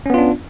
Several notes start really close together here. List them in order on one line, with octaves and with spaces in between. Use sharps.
C#4 B3 F4 D4